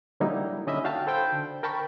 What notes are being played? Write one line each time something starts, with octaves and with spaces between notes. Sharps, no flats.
D3 F#3 G3 A#3 D#4 E4
D3 C#4 D#5 E5 B5 D#6
D#4 F#4 F5 G5 A5
A4 C5 G5 B5 G6
D3
A#4 G5 A5 B5 C#6